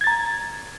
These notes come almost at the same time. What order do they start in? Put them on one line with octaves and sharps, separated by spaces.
G#6 A6 A#5